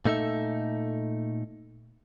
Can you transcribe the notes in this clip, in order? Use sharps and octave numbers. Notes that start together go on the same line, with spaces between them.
A#2 A3 D#4 A4 E5